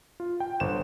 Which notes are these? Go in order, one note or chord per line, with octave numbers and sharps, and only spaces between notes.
F4
G5
G1 C5 E7